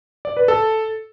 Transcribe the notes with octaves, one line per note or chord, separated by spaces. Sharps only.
D5
B4
A4